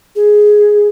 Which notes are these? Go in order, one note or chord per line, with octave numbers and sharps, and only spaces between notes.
G#4